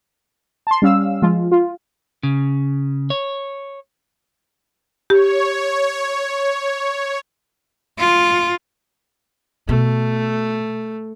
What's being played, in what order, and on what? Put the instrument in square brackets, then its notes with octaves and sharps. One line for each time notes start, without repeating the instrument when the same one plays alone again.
[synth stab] A5 C6
G3 C#4 F5 E6
F3 G#3 F4
F4
[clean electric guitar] C#3
C#5
[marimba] G4 [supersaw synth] C#5
[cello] F4
[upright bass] B2 [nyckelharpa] A3